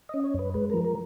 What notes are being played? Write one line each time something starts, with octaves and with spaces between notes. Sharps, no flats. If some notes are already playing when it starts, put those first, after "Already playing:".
C#4 D#5
C#5
F#2 B4
G#3 B4
F3 A#4
A#4